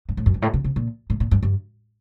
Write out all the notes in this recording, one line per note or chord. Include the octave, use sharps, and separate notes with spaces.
G2
A2
F#2
G2
A2
C3
C3
A#2
A2
A#2
G2
G2